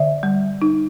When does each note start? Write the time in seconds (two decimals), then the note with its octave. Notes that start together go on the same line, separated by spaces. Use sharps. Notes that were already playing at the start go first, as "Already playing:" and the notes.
Already playing: D3 D5 E5
0.23 G3
0.62 D#4